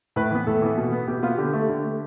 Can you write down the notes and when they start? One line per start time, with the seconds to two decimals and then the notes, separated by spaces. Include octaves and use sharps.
0.16 A2 B4
0.31 E3 B3
0.47 A2 A4
0.62 E3 B3
0.78 B2
0.92 B3
1.07 B2 G4
1.23 B3 F4
1.38 D3 G4
1.53 A3
1.69 D3
1.83 A3